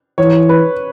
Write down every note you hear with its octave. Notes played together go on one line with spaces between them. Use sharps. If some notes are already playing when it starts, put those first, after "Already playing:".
E3 C#5
B4